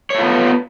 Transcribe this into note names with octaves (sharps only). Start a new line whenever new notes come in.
A3 B3 F4 C#5